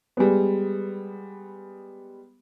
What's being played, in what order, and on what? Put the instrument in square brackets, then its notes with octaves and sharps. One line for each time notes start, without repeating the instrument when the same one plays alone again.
[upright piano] G3 G#3 B3